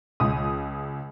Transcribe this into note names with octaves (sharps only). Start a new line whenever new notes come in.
C#2 D#6